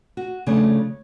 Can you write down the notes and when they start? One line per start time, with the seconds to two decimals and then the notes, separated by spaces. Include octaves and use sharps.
0.17 F#4
0.47 C#3 F3 A3 D4 C#5